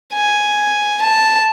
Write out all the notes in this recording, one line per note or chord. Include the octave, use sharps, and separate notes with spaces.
G#5
A5